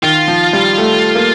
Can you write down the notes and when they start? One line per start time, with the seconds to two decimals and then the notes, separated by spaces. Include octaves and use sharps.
0.02 D#3 F4
0.28 F3
0.53 G3
0.78 A3
1.15 A#3